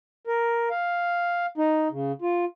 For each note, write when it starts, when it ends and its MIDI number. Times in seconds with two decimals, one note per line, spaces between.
0.27 0.69 70
0.70 1.46 77
1.58 1.88 63
1.92 2.12 49
2.22 2.45 65